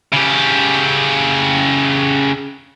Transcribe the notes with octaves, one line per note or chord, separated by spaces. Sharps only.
C#3 G4